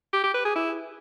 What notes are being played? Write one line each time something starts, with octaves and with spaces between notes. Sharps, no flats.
G4
G4
B4
G#4
E4